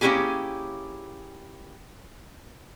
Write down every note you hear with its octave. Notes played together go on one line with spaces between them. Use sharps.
A#3 C#4 D#4 E4 G4 G#4